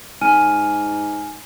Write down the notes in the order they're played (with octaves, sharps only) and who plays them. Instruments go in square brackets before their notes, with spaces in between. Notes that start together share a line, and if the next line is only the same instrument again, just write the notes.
[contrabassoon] G#2 [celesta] G#5 F6 D#7